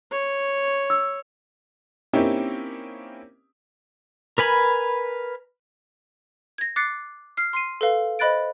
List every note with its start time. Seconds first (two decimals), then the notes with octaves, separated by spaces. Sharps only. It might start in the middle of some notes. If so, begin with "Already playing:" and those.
0.12 C#5
0.90 E6
2.13 A#3 C4 C#4 D#4 E4 G4
4.38 A#4 B4 G#5 B5
6.58 G#6 A#6
6.76 D6 F#6 A6 C7 C#7
7.37 F6 C7
7.53 C6 C7 D#7
7.81 A4 B4 F5
8.19 C5 D#5 B5 F#6 A6 D7